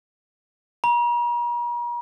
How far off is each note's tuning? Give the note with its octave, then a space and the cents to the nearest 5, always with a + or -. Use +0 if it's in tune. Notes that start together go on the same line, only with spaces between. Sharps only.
A#5 +45